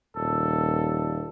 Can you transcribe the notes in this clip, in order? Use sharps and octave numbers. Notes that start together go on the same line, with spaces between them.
D#1 A4